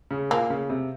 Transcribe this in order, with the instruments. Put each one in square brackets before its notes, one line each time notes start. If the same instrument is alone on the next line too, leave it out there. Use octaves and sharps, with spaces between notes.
[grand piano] C#3
[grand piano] A#2 [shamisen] A#3
[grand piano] C#3
C3